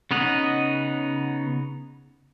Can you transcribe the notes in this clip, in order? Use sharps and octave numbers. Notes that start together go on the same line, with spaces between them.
C#3 B3 D#4 D#5 F#5